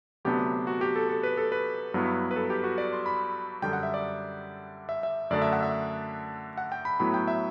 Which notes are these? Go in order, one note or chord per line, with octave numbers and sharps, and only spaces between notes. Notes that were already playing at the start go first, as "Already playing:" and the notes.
D2 C3 F#3 B3 D4 G4
F#4
G4
A4
A4
B4
A4
B4
G2 F#3 B3 E4
B4
A4
G4
F#4
D5
C6
B5
F#2 D3 G3 G5
F#5
E5
D5
E5
E5
F#2 D3 A3 D4 D5
E5
F#5
E5
F#5
G5
B5
A2 F#3 B3 E4 B5
G5
E5